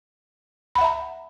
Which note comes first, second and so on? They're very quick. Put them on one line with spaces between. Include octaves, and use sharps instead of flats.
B5 F#5 E5 A#5